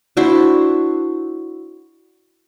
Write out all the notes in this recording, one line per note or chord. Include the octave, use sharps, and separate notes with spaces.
D4 E4 F#4 C5